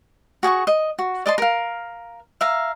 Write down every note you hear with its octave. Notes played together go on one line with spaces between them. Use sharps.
F#4 G#4 F#5 C#6
D#5
F#4
D5 D#5 A5 C6
A#4 F5
E5 F5 A#5